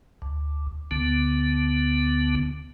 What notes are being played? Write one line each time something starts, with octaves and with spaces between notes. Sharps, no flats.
D2
D2 D3 B3